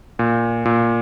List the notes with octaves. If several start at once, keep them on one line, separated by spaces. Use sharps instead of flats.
A#2
A#2